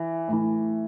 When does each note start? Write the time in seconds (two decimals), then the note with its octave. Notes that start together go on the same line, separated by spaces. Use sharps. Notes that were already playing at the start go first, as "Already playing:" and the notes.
Already playing: E3
0.28 A2 E3